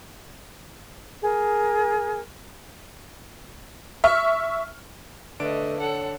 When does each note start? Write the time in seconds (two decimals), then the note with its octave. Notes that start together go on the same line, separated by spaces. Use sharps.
1.21 G#4 A#4
4.04 E5 C#6 F6
5.40 D3 A3 D4 A4 B4 D#5 D7
5.79 A4 C#5 F#5